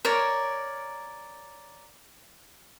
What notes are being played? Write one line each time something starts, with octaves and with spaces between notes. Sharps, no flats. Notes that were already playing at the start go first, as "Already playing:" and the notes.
A#4 C#5 D5